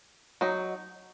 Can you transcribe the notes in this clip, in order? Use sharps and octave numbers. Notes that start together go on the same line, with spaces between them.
F#3 D#4